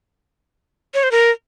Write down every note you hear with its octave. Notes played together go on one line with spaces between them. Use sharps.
C#5
C5
A#4